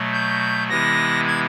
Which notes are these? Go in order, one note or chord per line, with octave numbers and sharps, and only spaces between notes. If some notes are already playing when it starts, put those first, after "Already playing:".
Already playing: B2 F#3 A3
G6
C3 E3 G#3 B3 E4 A#6
G#6